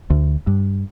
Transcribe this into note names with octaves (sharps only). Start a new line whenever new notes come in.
D2
G2